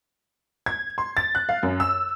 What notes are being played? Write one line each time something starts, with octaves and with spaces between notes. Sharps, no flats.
G#6
C6
A6
F#6
F5
F#2
E6